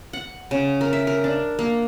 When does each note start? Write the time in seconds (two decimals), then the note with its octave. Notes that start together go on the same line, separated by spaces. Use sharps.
0.13 F#5
0.51 C#3
0.81 A#4
0.93 E5
1.07 A#4
1.24 D4
1.59 A#3